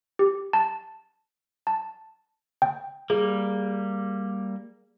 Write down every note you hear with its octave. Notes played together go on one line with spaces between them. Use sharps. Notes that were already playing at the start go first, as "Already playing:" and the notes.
G4
A5
A5
G5
G3 A#3 G#4